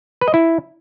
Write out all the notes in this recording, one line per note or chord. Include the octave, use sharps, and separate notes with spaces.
B4
D#5
E4